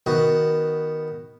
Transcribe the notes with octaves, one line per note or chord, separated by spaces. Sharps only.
D#3 B3 F#4